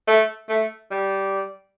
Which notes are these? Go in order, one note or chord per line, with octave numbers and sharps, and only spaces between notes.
A3
A3
G3